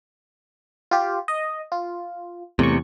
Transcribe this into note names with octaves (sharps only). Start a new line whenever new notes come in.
F4 G4
D#5
F4
E2 A2 C3 C#6